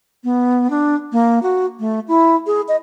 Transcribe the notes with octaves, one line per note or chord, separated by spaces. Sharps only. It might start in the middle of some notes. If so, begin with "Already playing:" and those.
B3
D4
A#3
F#4
A3
E4
G#4
D#5